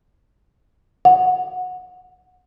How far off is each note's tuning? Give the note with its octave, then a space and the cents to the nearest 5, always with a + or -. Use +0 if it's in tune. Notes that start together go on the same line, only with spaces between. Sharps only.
F#5 -15